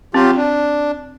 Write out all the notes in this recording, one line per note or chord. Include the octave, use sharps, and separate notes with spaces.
F#3 C4 F4 G4
D4